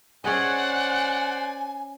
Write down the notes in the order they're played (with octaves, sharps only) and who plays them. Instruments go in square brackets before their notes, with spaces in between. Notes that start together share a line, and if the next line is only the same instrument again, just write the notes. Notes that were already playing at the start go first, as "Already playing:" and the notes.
[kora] C#4 G#4 D#5 [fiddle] C5 D5 [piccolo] F#5 [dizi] G#5